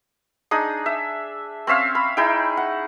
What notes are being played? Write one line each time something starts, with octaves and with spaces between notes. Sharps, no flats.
D4 D#4 G#4 D#6
E5
C4 C#4 E5 F5
B5
D#4 E4 G#4 G5
F#5